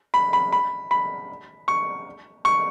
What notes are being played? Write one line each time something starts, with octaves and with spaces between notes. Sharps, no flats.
B5
B5
B5
B5
C#6
C#6